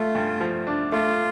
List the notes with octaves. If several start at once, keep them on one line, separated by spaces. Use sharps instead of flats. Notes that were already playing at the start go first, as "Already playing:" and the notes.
Already playing: A3 F4
G2
F3
D4
A3 F4